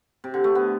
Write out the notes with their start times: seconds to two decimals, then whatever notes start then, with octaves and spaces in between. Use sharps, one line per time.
0.24 C3
0.34 D3
0.44 A3
0.55 B3